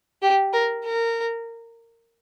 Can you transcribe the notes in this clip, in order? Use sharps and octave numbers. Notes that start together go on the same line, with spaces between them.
G4
A#4
A#4